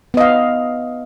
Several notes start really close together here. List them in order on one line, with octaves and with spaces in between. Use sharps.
B3 D#5 F5